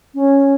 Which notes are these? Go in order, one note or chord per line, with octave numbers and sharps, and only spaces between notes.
C#4